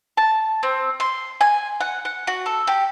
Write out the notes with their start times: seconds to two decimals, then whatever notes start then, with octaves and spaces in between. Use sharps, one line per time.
0.17 A5
0.63 C4
1.00 C6
1.41 G#5
1.80 F#5
2.05 F#5
2.27 F#4
2.46 A4
2.67 G4